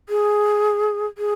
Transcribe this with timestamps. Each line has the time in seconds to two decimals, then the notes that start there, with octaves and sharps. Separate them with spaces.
0.09 G#4
1.18 G#4